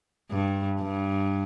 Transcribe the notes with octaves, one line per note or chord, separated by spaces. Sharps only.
G2
G2